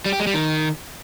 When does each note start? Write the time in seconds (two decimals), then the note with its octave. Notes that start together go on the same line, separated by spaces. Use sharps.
0.06 G3
0.13 G4
0.20 G#3
0.27 G3
0.34 D#3